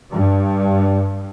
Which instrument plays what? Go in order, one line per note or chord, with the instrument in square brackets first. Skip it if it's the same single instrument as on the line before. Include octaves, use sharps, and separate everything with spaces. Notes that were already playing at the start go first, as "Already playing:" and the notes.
[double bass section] G2